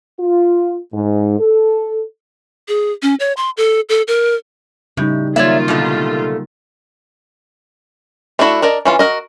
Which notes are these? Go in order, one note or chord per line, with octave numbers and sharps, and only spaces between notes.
F4
G#2
A4
G#4
C#4
C#5
C6
A4
A4
A#4
A2 C#3 G3 D#4
D#3 F#3 A#3 F4 C#5 D5 E5
B2 D3 A3
A3 B3 D4 E4 F#4
D4 A#4 D5 D#5
E3 C#4 F4
F#4 A#4 D#5